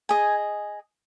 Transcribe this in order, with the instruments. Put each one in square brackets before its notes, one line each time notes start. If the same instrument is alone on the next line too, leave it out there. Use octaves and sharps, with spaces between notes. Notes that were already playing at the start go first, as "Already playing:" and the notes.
[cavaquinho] G#4 D#5 G#5